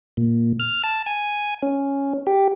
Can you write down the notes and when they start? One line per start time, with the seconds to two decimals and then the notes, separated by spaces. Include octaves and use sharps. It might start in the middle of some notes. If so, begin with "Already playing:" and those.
0.17 A#2
0.60 F6
0.83 A5
1.06 G#5
1.62 C#4
2.27 G4